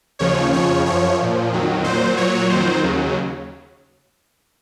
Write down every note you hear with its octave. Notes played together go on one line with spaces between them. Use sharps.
D#2 C#3 F3 C#5
F2 C#3 F3 C#5
F#2 F3 C#5
A#2 F3
F2 D#3 F#3
A#2 F#3 C5
A#2 F#3 C#5
F2 D#3 F#3 C5
D#2 C#3 F#3